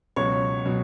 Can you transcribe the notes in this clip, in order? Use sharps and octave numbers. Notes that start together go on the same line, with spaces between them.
C#2 B2 F#3 C#5
B2 F#3